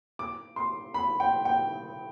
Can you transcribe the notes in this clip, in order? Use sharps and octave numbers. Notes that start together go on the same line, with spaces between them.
D6
C6
B5
G5
G5